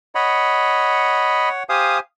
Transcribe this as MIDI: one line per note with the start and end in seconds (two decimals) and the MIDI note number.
0.15 1.63 73
0.15 1.49 75
0.15 1.63 78
0.15 1.49 83
1.69 2.00 67
1.69 2.00 72
1.69 1.98 77
1.69 2.00 80
1.69 1.98 87